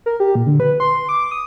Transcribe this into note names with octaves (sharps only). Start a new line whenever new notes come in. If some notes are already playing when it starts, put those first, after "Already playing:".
A#4
G4
A#2
D3
B4
C6
D6
D#6